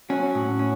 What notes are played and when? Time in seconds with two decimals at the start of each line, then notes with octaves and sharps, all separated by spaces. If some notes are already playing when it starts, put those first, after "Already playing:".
0.10 F#3 C#4 F#4
0.35 A2
0.59 C#4